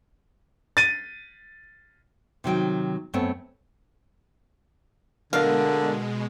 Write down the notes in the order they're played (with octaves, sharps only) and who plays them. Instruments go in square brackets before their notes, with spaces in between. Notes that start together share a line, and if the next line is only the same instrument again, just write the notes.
[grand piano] A6 D#7
[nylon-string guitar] C3 D#3 F#3 G5
F#2 A3 B3 C4 C#5 A5
[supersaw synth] B2 G#3 [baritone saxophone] D3 [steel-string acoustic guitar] A3 A#4 D5 [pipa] F5